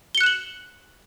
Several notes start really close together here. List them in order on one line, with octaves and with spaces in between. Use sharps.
G7 C#7 F#6 E7 F#7